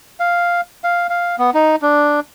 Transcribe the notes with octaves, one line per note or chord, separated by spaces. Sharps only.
F5
F5
F5
B3
D#4
D4